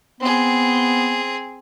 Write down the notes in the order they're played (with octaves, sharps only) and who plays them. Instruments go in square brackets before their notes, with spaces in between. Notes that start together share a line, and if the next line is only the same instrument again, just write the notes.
[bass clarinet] B3 [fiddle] C4 G#4